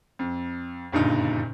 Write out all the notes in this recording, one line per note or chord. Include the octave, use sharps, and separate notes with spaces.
F2
F#1 G2 A#2 D3 D#4